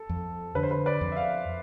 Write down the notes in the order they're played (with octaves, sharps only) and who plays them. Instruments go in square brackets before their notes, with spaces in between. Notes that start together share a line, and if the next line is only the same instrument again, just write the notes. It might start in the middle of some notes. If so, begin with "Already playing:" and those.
Already playing: [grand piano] A4
[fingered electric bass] F2
[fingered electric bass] D3 [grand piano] B4
[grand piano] C5
B4
B4 D5
[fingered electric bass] F2
[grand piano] E5
D5 F5